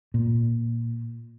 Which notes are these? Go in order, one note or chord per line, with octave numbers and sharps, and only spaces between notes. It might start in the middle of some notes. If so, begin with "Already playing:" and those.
A#2